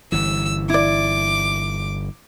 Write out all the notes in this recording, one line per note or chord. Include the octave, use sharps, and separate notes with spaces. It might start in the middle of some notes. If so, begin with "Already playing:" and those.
G1 E3 E6
E4 D5 D6